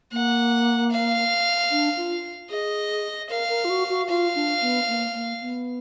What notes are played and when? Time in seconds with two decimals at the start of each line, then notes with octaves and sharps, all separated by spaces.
0.12 A#3 F#5
0.91 F5
1.71 D4
1.97 F4
2.50 G#4 D#5
3.30 A#4 F5
3.49 A#4
3.65 F4
3.70 F#4
3.89 F#4
4.09 F4 F5
4.35 D4
4.61 B3
4.88 A#3
5.15 A#3
5.41 B3